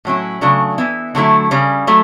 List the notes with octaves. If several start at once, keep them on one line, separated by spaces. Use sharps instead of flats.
A2 F#3 C#4 E4
C#3 F#3 A3 D4
E3 B3 E4
D3 F#3 A3 E4
C#3 G3 C#4
F#3 A3